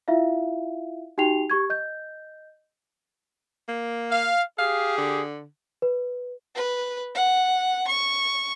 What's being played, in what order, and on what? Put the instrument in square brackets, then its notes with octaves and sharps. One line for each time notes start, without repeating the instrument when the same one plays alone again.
[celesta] E4 F4 E5 F5
D#4 F#4 G4 G5 C7 F7
G4 C#6 G#6
D#5 G6
[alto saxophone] A#3
[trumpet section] F5
[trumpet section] G4 G#4 [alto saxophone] F5
[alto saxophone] D3
[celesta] B4
[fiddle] B4
F#5
C#6